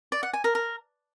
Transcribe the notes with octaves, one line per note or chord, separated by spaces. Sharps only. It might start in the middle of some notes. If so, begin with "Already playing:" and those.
D5
F#5
G#5
A#4
A#4